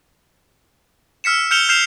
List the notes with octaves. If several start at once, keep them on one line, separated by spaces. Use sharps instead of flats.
E6 F6 B6 C#7 E7
F6 G6 C#7 E7 F7 G7
F6 G6 C7 E7 F7